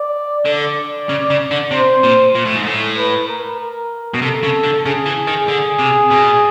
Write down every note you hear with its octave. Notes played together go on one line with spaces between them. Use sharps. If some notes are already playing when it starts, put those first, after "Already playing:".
Already playing: D5
D3 D5
C#3
C#3
D3
C3 C5
A#2
A#2
A2
G#2
A2
B4
A#4
A#4
B2
C3 A4
C#3
D3
C#3 G#4
E3
D#3
D3 G#4
C3
B2